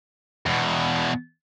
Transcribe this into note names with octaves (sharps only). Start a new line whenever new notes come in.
E2 B2